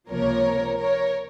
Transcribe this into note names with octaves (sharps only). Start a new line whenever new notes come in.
C#2 C3 F3 A#3 A#4 C#5
A#4 C#5